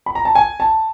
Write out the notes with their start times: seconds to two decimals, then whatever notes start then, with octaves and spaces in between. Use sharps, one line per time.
0.06 B5
0.15 A#5
0.25 A5
0.35 G#5
0.60 A5